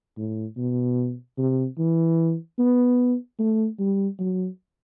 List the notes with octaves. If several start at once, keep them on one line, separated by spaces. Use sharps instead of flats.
A2
B2
C3
E3
B3
A3
G3
F#3